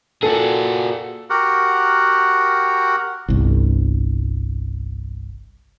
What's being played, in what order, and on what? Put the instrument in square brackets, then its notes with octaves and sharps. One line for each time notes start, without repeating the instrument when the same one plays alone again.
[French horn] A#2 [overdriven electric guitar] F#4 G#4 [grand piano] A4
[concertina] F#4 G4 A#4 F#5
[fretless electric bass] G1 C2